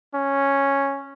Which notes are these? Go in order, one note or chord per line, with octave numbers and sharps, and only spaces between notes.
C#4